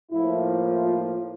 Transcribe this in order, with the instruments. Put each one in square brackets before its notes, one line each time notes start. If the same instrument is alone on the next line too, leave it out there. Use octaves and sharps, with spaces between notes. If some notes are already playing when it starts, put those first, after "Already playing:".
[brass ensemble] A2 F3 A#3 E4
F4